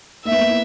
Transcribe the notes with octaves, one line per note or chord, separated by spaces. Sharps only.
A#3 E5
B3
A#3
E4